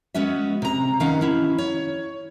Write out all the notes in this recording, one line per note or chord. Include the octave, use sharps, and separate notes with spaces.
G#3 B3 C#4 F#4 E5
C3 A#5
D#3 C#4 F5 F#5
C#4 E4
C#5